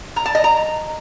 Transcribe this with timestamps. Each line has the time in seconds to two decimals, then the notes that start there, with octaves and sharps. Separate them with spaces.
0.16 A#5
0.26 A5
0.35 D#5
0.44 A#5